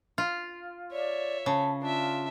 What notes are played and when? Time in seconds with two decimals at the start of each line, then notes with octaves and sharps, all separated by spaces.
0.18 F4
0.92 C#5 D5 E5
1.46 C#3 A5
1.82 D4 F4 E5